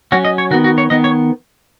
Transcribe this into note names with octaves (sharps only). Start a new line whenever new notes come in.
F#3 C#4 F#4
D#5
C#5
D#3 B3 F#4
F#4
C#5
D#3 B3 D#5
C#5